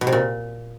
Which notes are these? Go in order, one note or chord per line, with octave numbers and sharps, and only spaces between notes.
B2
C3
A#2